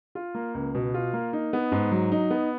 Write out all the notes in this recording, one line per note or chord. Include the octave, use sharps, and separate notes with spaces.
F4
A#3
C#2
B2
F4
A#3
D#4
B3
G#2
F#3
D#4
B3